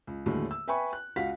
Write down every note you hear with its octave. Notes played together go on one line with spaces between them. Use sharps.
C#2
D#2 A2 D3 F#3 G#3
E6
B4 E5 G5 G#5 B5 C#6
F#6
C#2 F#4 F5 F#5 B6